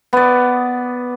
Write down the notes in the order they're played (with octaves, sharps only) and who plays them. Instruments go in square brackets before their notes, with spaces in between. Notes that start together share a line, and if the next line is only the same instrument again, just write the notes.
[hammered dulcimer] B3 D5